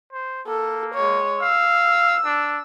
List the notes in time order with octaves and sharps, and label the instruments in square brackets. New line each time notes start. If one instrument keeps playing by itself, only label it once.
[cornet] C5
[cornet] A#3 [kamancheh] A4
[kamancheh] G#3 C#5
[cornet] F5 [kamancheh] E6
[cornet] D4